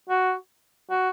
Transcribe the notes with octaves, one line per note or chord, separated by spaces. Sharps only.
F#4
F#4